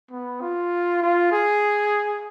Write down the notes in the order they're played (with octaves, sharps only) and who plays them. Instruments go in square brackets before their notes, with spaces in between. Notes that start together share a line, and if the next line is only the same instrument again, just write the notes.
[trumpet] B3
F4
F4
G#4